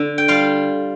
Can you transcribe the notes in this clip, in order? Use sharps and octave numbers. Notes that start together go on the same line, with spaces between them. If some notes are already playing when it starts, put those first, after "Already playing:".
Already playing: D3
G5
G3 F4 F5